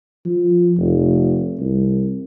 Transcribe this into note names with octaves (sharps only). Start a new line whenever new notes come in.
F3
F1
C2